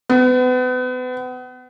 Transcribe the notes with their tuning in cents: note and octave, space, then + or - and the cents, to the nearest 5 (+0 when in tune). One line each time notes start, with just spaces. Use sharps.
B3 +35